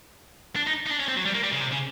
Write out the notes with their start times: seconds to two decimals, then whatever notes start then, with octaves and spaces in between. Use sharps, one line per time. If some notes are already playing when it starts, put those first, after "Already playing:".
0.56 D4
0.67 D#4
0.86 D#4
0.91 D4
1.00 C#4
1.08 C4
1.17 F#3
1.25 G3
1.34 A#3
1.43 G3
1.52 C#3
1.61 C3
1.72 C#3